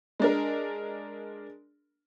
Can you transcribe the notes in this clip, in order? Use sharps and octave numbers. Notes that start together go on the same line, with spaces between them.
G#3 D4 A#4